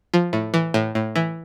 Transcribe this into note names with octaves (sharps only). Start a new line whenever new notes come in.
F3
A2
E3
A2
A2
E3